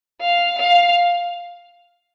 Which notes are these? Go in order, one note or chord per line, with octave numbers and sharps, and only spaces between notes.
F5
F5